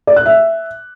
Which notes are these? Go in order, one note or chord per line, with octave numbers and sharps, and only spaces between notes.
D5
F#6
E5